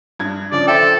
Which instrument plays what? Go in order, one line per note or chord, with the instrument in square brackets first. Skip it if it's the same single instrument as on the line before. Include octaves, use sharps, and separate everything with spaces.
[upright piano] G2 G#6
[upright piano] C#3 F3 D4 [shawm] D5
[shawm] A4 [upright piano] C5 E5 G5